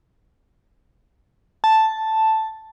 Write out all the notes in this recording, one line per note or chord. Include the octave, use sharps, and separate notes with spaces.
A5